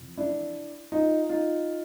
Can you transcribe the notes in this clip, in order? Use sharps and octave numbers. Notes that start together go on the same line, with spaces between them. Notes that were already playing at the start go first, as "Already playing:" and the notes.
Already playing: F2 C3 E3
D4 E4
D#4 F4
D#4 F4